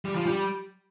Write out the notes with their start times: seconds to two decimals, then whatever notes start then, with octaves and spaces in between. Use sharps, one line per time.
0.05 G3
0.15 F3
0.26 G3